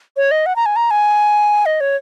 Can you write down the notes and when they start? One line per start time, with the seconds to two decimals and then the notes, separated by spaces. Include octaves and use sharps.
0.17 C#5
0.31 D#5
0.46 F#5
0.56 A#5
0.66 G#5
0.76 A#5
0.91 G#5
1.66 D#5
1.81 C#5